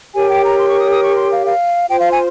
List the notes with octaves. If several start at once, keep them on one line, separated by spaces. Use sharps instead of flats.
G4 A#4 C#5 G#5
G5
A#5
C6
C#6
D#6
D#6
C#6
C6
F5
F5
F4 C5 G5
F5
G#5